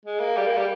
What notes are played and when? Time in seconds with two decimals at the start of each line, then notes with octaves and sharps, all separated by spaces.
0.05 G#3
0.20 A#3
0.37 G3
0.47 A#3
0.57 G3